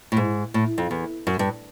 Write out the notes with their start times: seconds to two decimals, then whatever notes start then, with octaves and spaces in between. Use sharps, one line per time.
0.12 A2
0.17 G#2
0.54 A2
0.78 F2
0.91 E2
1.27 F#2
1.39 G2